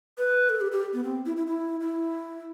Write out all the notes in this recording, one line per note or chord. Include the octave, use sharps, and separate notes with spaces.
B4
A4
G4
G4
B3
C4
E4
E4
E4
E4